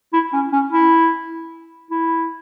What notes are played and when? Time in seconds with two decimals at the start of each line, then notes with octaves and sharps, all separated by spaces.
0.13 E4
0.33 C#4
0.53 C#4
0.72 E4
1.91 E4